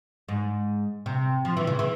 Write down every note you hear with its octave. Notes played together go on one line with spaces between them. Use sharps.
G#2
C3
F3
E3
C#3
E3